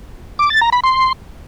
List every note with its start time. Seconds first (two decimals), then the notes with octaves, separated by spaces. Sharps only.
0.39 D6
0.50 A6
0.61 A#5
0.72 B5
0.84 C6